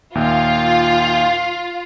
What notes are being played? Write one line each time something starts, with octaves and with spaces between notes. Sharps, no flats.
D#2 A#2 F4 E5